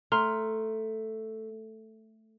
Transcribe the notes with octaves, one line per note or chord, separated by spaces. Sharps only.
A3 A#5 C6 F6